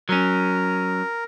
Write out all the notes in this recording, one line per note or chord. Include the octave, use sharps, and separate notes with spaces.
F#3 C#4 A#4